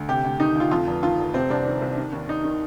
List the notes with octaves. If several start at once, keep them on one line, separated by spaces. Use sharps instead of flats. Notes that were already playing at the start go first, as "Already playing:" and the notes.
Already playing: D2
C3 G4
D2
D#3 D#4
D2 F4
F2 F4
F1
D#3 F4
F1
C3 C4
C2 D4
D#3
C2
D#3
D#2
D#2 D#4
D#3